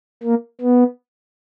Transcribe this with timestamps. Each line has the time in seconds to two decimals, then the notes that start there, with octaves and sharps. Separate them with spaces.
0.23 A#3
0.61 B3